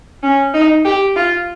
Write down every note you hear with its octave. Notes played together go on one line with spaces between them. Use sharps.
C#4
D#4
G4
F4